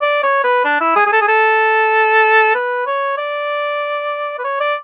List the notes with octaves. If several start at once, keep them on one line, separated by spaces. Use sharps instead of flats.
D5
C#5
B4
D4
E4
G#4
G#4
A4
G#4
A4
B4
C#5
D5
B4
C#5
D5